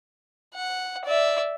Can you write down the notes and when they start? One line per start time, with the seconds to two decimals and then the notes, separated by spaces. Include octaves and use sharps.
0.55 F#5
1.05 D5 E5